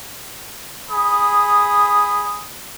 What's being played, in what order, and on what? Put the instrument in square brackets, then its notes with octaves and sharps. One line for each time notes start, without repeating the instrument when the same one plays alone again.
[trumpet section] G#4 B5 D#6